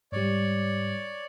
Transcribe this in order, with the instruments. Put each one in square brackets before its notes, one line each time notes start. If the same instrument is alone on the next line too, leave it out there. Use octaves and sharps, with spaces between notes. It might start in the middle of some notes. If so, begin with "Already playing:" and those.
[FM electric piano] G#2 G3 [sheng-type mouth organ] C#5 D5